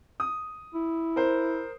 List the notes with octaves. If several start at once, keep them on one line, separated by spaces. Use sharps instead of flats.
D#6
E4
A#4 C5